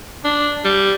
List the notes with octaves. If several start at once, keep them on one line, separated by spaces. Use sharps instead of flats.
D4
G3